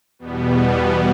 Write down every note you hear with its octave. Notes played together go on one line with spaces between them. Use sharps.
E2 B2 G3 B3